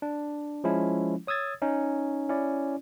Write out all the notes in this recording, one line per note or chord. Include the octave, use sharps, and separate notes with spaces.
D4
F3 G#3 C#4 E4
C#5 D#6 E6 G#6 A6
C#4 D#4
C#4 E4 D5